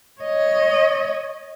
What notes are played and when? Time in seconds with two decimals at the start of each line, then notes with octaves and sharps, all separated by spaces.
0.22 C#5 D#5